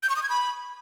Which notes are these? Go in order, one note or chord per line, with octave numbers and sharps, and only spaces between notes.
G6
C#6
D#6
G#6
B5